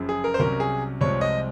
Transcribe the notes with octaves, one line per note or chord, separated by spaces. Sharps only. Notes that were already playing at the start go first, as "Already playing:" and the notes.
Already playing: F#1 F#2 C#3 F3
G#4
A#4
C5
C2 C3 F#3 C#4 A#4
G#4
C2 C3 F3 G#3 C4 C#5
D#5